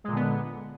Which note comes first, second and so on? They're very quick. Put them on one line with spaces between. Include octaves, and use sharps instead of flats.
G#3 A#2 D3 B3